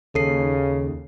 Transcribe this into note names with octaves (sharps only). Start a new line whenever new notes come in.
D#2 C#3 A4 C7